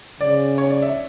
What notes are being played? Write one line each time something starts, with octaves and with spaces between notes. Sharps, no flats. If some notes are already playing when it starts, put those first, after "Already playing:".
C#3 D5
C#5
D5
E5